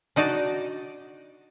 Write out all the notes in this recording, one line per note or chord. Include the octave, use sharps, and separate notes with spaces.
D4 D#4 F#4 D5